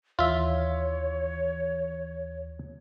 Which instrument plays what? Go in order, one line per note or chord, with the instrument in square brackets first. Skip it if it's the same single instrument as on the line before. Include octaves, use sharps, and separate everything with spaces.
[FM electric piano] D#2 E3 [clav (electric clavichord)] F4 E5 [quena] C#5